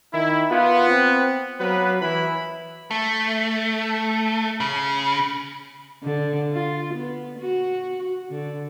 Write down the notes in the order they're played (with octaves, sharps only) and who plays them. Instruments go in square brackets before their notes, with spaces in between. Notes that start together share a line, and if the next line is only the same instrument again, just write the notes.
[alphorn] D#3 [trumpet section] E4
[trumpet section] B3 [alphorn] F4
[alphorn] C4
[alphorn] F#3 [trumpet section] A#3 B3 B4
[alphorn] E3 [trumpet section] E4 B5
[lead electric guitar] A3
C#3
[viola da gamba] D3
F4
B3
F#4
D3